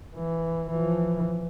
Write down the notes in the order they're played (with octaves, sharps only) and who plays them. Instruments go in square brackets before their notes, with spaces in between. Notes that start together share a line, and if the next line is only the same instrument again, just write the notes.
[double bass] E3
E3 F3